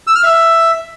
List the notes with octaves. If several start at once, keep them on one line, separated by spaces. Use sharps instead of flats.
E6
F6
E5